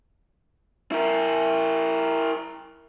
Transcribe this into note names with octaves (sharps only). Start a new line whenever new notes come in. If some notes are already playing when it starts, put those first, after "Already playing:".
E4 A#4